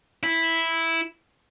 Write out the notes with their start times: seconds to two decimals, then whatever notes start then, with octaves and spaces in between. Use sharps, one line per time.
0.23 E4